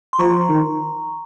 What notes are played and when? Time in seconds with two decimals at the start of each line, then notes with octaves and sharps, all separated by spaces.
0.13 C6
0.19 F3 A#5 C#6
0.49 D#3